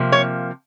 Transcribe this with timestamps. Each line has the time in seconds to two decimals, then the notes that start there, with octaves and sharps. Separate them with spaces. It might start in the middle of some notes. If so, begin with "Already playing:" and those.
Already playing: C3 F3 A#3
0.12 C#5